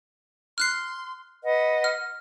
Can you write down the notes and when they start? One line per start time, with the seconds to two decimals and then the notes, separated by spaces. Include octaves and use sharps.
0.58 C6 F6 F#6 C7
1.43 B4 D#5 F#5
1.84 F6